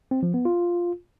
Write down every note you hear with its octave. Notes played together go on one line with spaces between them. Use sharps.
C4
F3
B3
F4